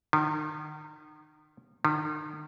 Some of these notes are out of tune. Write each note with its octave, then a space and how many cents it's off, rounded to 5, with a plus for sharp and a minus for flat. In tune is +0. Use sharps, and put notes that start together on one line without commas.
D#3 -35
D#3 -40